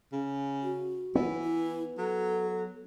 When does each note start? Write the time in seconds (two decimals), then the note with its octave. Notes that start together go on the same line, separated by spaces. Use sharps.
0.13 C#3
0.63 F#4
1.15 E3 B3
1.44 E4
1.98 F#3 A4